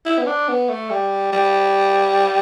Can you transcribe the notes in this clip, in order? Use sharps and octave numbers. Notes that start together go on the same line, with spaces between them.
E4
B3
D4
B3
A3
G3
G3